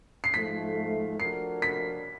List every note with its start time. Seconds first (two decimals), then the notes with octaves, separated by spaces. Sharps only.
0.24 C7
0.33 G#2 F3 A3 B6
1.19 F3 A3 D4 F#4 A#4 C7
1.62 B6